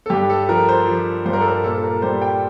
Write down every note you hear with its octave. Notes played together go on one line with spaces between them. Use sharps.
A4
G2 G4
A4
F3 A#4
C5
F3
G2 C5
A#4
A4
A#4
A#2 A4
A#4
G3 C5
G5